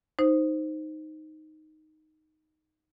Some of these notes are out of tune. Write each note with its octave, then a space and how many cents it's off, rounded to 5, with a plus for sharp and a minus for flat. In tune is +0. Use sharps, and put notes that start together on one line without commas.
D#4 +0 C5 +0